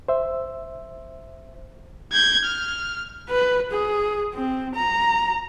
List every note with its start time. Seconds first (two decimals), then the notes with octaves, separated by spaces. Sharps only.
0.08 C5 E5
2.12 G6 G#6
2.44 F6
3.29 B4
3.72 G#4
4.34 C4
4.75 A#5